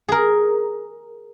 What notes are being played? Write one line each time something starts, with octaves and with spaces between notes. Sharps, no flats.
G#4 A#4